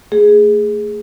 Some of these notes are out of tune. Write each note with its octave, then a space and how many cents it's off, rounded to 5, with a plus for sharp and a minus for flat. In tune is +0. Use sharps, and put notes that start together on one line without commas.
A3 +25 G#4 +0